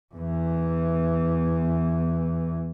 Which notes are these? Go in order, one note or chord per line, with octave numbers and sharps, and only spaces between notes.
E2 E3